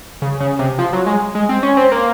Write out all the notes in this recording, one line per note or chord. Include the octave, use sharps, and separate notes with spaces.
C#3
C#3
C3
F3
F#3
G#3
G#3
C4
C#4
C4
A#3